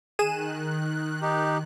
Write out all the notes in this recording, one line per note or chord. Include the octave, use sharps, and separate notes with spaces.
D#3 G#4 F#6 D#7 E7
D#4 G4